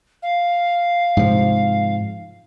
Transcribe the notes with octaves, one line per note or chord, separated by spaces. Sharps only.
F5
G#2 C3 F3